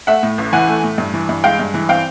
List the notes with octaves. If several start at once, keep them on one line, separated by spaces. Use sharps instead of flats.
A3 E5 F#5
A2
A1
E3 F#5 G#5
A3
A2
G2
E3
G2
G#3 F5 G5
G2
E3
C4 F5 G5